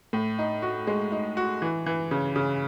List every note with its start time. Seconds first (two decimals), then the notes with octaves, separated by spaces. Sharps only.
0.13 A2
0.39 D#4
0.62 F#4
0.87 G#3
1.12 D#4
1.37 F#4
1.62 E3
1.86 E3
2.11 C#3
2.36 C#3